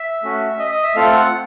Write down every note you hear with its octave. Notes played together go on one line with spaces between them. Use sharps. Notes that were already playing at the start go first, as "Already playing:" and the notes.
Already playing: E5
A3 C#4 F#4
D#5
D#5
E5
A3 C4 F4 A4 F5
F#5